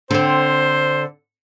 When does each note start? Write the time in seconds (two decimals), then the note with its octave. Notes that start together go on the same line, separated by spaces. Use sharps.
0.11 D3 C4 C5